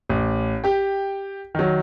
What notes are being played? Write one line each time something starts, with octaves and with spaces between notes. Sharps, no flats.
A1
G4 G5
D#3 F#3